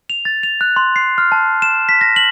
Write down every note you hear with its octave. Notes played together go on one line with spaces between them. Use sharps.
F7
A6
F7
F#6
C6
C7
F6
A5
E7
B6
A#6
F#7